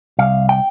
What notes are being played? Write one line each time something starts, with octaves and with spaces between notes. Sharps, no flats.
C2 F5
G5